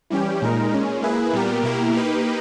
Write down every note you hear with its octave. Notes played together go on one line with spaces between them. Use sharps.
E3 G3 C#4 G4
A#2 G#3 D#4 A#4
A#2 G#3 C#4
A#3 E4 G#4 B4
A#2 G3 B3 G4 A#4
B2 A#3 E4 G4 A#4
A#3 D#4 G4 B4